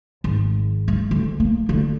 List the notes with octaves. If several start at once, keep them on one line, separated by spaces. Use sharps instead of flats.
G#1
G#3
D2
A#3
D3